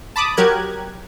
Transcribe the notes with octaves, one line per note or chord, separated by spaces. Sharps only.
A5 B5 D6 D#6
F#3 G4 A#4 F#6 G#6